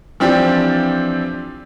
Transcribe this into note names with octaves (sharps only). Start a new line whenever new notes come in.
E3 F3 C4 D4 G4